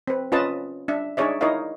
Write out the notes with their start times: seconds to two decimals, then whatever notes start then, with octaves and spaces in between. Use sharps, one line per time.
0.08 C4 B4
0.32 C#4 F4 B4 D#5 A5
0.88 D4 E5
1.17 D4 D#4 G#4 C#5 D5 E5
1.41 D#4 E4 A#4 C#5 D#5 F5